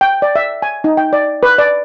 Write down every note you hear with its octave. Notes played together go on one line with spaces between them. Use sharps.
G5
D5
E5
G#5
D#4
G5
D5
B4
D5